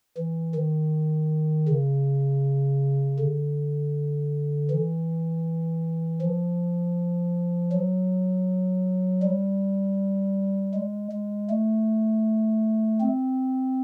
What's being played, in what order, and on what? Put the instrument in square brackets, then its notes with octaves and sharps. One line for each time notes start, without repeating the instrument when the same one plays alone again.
[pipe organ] E3
D#3
C#3
D3
E3
F3
F#3
G3
G#3
G#3
A3
C4